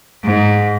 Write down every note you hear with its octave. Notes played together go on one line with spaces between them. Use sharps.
G#2